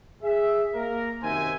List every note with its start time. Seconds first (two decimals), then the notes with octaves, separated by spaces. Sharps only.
0.23 G#4 E5
0.75 A#3 A#4
1.23 F#2 C3 D#3 C5 E5 G#5